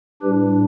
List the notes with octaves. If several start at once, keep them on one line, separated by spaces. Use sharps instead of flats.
A2 G3 D4 G4 B4